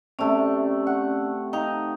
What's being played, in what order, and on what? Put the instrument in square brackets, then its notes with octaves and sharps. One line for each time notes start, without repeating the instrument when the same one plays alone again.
[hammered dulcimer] C3 A3 [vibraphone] C#4 D5
[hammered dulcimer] F#5
[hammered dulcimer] D#4 [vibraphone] F5 G5